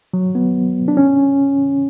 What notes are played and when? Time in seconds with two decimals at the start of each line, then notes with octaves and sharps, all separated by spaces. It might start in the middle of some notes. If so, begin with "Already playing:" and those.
0.14 F#3
0.35 B3
0.88 D4
0.97 C#4